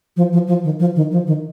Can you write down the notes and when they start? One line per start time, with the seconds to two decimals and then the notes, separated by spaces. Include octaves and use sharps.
0.17 F3
0.33 F3
0.47 F3
0.64 D#3
0.80 F3
0.96 D#3
1.11 F3
1.27 D#3